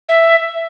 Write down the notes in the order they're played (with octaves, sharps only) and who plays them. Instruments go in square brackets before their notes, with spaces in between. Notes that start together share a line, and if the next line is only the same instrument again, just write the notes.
[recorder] E5